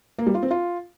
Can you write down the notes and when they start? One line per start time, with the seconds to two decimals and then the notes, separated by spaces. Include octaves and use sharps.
0.19 A#3
0.27 G3
0.35 F4
0.43 C4
0.51 F4